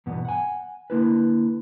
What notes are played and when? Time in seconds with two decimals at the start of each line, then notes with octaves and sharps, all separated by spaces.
0.06 E2 G2 B2 B3
0.25 F#5 G#5
0.90 D3 A#3 E4 B4